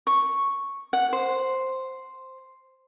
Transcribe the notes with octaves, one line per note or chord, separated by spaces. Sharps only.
C#6
F#5
C5